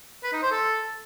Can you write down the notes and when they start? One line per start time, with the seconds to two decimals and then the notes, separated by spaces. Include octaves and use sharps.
0.24 B4
0.33 D#4
0.42 C5
0.52 A4